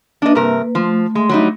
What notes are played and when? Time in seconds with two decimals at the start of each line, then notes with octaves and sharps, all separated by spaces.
0.22 A#3 D4 B4 D#5
0.35 G2 C3 A#4
0.75 F3 A3
1.15 G#3
1.29 F#3 G3 D#4